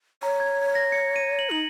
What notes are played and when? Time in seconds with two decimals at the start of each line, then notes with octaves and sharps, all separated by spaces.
0.23 C#5 A#5
0.40 G#6
0.75 A#6
0.92 C#7
1.16 D#7
1.39 F#7
1.50 D#4 F#7